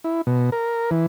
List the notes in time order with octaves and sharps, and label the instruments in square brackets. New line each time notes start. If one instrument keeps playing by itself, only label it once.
[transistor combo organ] E4
B2
A#4
E3